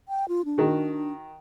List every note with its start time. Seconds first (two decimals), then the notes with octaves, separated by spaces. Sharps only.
0.09 G5
0.29 F4
0.45 D4
0.58 D#3 F#4